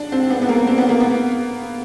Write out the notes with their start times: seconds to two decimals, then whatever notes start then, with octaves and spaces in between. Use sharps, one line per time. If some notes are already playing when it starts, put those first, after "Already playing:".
Already playing: D4
0.12 C4
0.30 B3
0.42 B3
0.49 A#3
0.67 C4
0.78 B3
0.89 A#3
1.00 B3